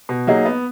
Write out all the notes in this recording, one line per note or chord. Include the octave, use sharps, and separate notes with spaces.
B2
F#3 A#3 D#4 G#4
B3